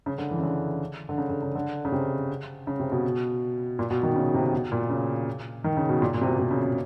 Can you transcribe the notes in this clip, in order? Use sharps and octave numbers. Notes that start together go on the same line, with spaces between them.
C#3
D3
E3
C#3
D3
D3
C#3
D3
C#3
D3
C#3
C3
C#3
C3
B2
A#2
B2
D#3
C#3
C3
B2
A#2
C#3
D#3
C#3
B2
A#2
A#2
C3
B2
C3
C#3
C#3